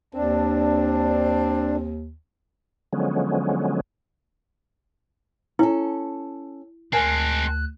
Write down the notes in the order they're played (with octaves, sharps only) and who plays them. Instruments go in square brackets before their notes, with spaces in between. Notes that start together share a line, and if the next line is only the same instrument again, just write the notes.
[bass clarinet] D#2 [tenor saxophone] C4 [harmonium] D4
[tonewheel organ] D3 F3 F#3 G#3 B3 C#4
[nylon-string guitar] C#4 A4 [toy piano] E4
[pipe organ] D2 F#6 [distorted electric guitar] G#3 C4 [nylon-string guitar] A#4 G#5 A5